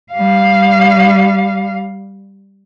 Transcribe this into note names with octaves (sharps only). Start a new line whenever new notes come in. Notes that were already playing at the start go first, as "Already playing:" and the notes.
G3 F5